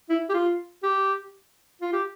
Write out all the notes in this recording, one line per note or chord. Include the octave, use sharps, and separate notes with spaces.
E4
G4
F4
G4
F4
G4